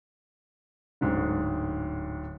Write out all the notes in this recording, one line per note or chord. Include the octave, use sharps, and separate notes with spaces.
D1 G#2 D3